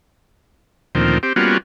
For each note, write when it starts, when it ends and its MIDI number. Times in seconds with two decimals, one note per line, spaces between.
0.95 1.18 38
0.95 1.18 46
0.95 1.18 51
0.95 1.18 53
0.95 1.18 60
1.23 1.33 60
1.23 1.33 67
1.36 1.58 55
1.36 1.58 58
1.36 1.58 59
1.36 1.58 61
1.36 1.58 65
1.36 1.58 66